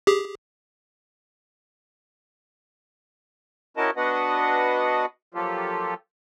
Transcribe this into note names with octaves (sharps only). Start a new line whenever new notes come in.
G4 G#4
C#4 E4 F#4 A#4 D#5 A5
B3 D4 F#4 B4 D#5 F#5
F3 F#3 A#3 F4 G4 A4